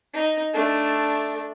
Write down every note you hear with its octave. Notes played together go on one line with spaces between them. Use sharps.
D#4
A3 D4